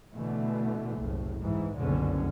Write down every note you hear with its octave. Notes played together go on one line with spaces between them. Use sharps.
B2 D3 E3 A3
F#1 C2 A2
G#2 E3
F#1 C2 F2 B2 D3 C#4